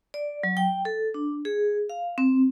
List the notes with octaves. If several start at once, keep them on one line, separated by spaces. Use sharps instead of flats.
D5
F#3
G5
A4
D4
G#4
F5
C4